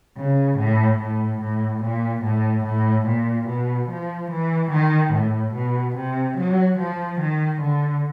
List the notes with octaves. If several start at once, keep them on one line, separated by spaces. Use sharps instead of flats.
C#3
A2
A2
A2
A#2
A2
A2
A#2
B2
F3
E3
D#3
A2
B2
C3
F#3
F3
D#3
D3